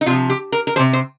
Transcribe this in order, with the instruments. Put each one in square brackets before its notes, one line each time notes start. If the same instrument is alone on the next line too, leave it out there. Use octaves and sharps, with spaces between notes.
[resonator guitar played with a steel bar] D#4
C3 F3 F4
G4
A#4
A#4
F3 C5
C3
C5